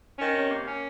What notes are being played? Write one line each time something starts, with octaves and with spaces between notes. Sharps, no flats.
D#3 C#4
C3 C#4
A#3
C#4